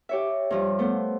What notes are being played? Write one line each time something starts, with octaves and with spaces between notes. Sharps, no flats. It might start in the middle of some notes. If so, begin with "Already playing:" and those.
G4 C#5 E5
G2 F3 G3
A3 B3 C5